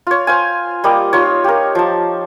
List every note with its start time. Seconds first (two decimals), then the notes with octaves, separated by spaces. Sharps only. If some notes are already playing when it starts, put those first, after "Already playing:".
0.07 F4 C#5
0.27 C5 F5 G#5
0.84 G3 A#3 G4 D#5
1.13 D#4 F4 C#5
1.44 G4 A#4
1.75 F3 A5